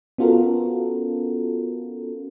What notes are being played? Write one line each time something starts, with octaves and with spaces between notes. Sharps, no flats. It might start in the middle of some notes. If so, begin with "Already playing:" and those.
B3 C#4 F4 F#4 A4 A#4